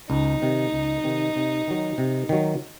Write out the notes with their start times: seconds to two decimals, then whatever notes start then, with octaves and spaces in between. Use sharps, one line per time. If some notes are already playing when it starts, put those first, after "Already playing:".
0.10 C#2 D#4
0.42 C3 D#3
0.72 C#2
1.04 C3 D#3
1.36 C3
1.67 D#3 F#3
1.98 C3
2.29 D#3 F#3